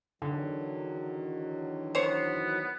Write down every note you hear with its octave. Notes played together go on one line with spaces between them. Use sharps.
E2 D3 D#3 F#3
B3 C5 C#5